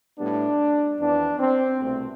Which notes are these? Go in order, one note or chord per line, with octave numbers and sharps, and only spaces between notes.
A2 G3 B3 D4
F2 E3 B3 D4
C4
C2 B2 A3 C4